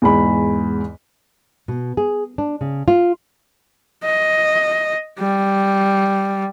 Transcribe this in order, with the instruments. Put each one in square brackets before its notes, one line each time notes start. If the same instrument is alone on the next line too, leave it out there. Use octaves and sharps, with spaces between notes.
[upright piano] E2 G#2 B5
[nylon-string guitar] B2
G#4
D4
C#3
F4
[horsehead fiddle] D#5
G3